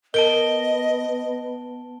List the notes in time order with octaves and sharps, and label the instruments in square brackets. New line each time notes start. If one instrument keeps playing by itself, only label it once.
[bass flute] B3 [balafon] A#4 [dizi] D#5 [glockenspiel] A5 D7 G7